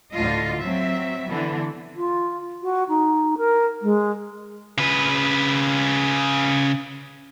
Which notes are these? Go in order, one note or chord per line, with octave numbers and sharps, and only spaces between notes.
D2 A2 D3 A3 F4 D#5
F#3 C4 E5
D3 E3 B3 D4
F4
F#4
D#4
A#4
G#3
C#3 B4